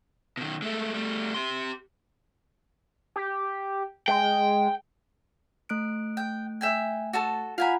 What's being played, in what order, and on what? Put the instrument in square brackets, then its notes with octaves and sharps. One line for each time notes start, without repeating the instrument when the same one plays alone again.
[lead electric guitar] B2 D#3
G#3 A3
G3 A3
G4 C6
[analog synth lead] G4
[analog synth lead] G#3 [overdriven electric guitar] G5
[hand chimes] A3 F#6 D7
[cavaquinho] G5
E5 G5 G#5
F#4 A4 A5
[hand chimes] F4 F#5 A#5 [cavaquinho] F5 G#5 B5